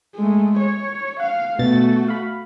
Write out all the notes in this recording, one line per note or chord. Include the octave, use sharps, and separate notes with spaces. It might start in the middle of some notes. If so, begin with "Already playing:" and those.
G#3 A3
C#5
F5 F#5
B2 A3 F#4 A6
F5 B5